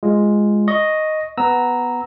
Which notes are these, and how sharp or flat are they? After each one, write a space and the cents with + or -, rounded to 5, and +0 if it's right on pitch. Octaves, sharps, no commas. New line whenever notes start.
G#3 +0 F4 -5
D#5 +0 C#6 +0
B3 +0 A#5 +0 E6 -20